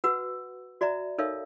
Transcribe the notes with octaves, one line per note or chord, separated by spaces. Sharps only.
F#4 B4 F#5 E6
F#4 D5 E5 A#5
D#4 A4 A#4 C#5 E5 F5